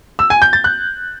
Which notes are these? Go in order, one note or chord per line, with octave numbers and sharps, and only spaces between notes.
E6
G#5
G6
A6
F#6